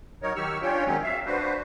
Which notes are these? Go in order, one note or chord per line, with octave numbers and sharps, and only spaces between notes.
F#3 D#4 A#4 C#5
D#3 F#3 G4 C#6 E6 F6
C#4 D4 F4 C#5 G5
D#3 F#3 G#3 C4 C#4
E5 F5
D4 F#4 B4 C5